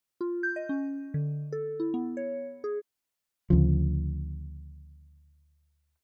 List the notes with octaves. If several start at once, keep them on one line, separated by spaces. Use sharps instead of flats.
F4
G6
D#5
C#4
D3
A4
E4
B3
C#5
G#4
D2 C#3 F3